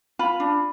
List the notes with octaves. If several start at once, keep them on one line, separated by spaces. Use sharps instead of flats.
F4 B5
D4